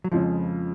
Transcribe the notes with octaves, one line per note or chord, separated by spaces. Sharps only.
F#3
F2 C#3 F3 G#3 C#4